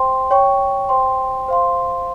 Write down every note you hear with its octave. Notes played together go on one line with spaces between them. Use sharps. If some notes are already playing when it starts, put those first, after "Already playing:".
Already playing: C5 G5 C6
C#5 G5 C#6
C5 G5 C6
C5 F5 C6